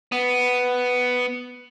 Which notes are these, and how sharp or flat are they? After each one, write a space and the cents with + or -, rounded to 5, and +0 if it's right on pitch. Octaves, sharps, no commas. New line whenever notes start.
B3 +5